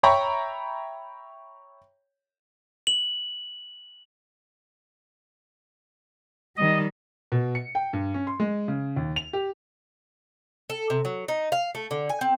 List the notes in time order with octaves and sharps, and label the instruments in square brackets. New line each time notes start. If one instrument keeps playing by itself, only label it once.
[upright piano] C#5 E5 G5 A#5 B5 C#6
[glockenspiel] F#7
[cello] D#3 G3 [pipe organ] D#5
[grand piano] B2
C#7
G5
G2
C#4
C6
G#3
C#3
D#2
F7
G4
[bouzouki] A4
C3
F#3
D#4
F5
A3
D3
G#5
C4